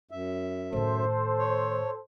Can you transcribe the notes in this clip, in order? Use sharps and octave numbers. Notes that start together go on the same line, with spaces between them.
F#2 E5
A2 D#3 A4 C5
C#5